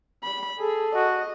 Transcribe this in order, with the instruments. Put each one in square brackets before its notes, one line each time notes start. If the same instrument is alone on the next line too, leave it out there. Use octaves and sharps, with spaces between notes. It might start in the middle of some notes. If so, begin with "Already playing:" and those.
[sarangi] B5
[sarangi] G#4 [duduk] A4
[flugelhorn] F#4 [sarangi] D#5